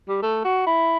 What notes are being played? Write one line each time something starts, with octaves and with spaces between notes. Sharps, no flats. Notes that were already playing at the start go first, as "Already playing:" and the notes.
G3
A3
F#4
E4